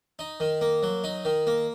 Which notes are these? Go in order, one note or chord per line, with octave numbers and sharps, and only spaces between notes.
D#4
D#3
A#3
F#3
D#4
D#3
A#3